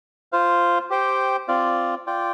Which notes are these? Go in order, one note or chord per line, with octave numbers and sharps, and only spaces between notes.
F4 C5 F5
G4 C5 G5
C4 F4 D5 F5
F4 D5 G5